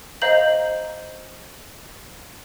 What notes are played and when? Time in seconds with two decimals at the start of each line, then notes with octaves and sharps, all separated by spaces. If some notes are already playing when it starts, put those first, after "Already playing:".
0.22 C5 D#5 F5 A#5 G6 F#7